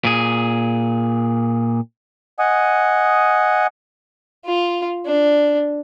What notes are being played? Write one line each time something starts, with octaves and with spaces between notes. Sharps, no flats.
A#2 G#4
D#5 F#5 G#5 D#6
F4
D4